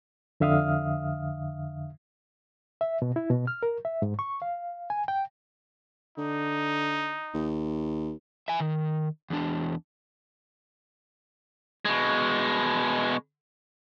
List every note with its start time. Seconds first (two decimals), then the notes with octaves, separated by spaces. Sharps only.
0.40 F2 D3 E5 F5 D#6 F6
2.81 E5
3.02 B2
3.16 E4
3.30 B2
3.47 F6
3.63 A#4
3.85 E5
4.02 G#2
4.19 C#6
4.42 F5
4.90 G#5
5.08 G5
6.18 D3 D#4
7.34 D#2
8.48 E5 G#5
8.60 D#3
9.30 E2 D4
11.85 B2 G#3